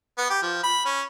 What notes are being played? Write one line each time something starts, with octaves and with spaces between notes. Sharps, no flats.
B3
G4
F3
B5
C#4